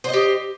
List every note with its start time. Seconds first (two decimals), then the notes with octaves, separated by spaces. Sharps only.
0.04 C5
0.09 D#5
0.13 G4